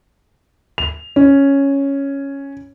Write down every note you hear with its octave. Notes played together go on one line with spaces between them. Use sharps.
F7
C#4